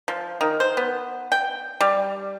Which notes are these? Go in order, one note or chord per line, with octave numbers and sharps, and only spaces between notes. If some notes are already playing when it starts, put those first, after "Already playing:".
F3
D#3
C5
B3
G5
G3